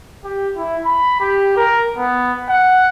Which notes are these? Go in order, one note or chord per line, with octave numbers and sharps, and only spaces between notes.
G4
E4
B5
G4
A#4
B3
F#5